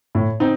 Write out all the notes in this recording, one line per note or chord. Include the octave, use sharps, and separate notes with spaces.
A2
C4 D#4